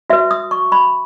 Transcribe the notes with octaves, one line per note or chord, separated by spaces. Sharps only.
F#4 B4 E5
D#6
C#6
B5